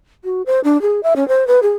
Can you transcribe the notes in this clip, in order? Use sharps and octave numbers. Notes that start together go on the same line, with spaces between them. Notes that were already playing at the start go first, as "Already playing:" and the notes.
F#4
C5
D4
G#4
E5
C#4
C5
B4
G#4